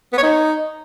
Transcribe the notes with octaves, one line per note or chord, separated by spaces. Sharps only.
B3
C#5
D#4